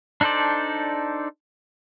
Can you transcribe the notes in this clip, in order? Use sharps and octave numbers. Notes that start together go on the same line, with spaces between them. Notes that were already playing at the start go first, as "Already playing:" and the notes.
D4 D#4 A4 C5 D5